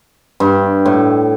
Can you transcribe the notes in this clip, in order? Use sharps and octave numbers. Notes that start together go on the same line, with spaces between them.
G2
A2